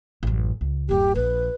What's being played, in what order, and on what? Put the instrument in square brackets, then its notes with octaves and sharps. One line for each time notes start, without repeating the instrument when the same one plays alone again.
[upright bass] A1 F#2
C#2
[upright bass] D1 F#2 [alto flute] G4
[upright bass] A#1 [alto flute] B4